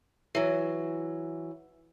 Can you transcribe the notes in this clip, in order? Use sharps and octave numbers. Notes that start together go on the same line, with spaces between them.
E3 F#3